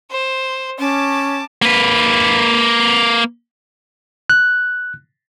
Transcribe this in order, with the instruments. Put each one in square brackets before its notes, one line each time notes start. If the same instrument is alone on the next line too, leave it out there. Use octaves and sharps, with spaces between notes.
[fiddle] C5
[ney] C#4 [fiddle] A5 D6
[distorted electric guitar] A#3 B4
[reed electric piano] F#6